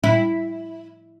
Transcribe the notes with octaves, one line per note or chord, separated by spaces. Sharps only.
E4